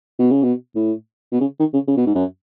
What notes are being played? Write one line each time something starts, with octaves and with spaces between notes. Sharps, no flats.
B2
C#3
B2
A2
B2
C#3
D#3
C#3
C#3
B2
G#2
F#2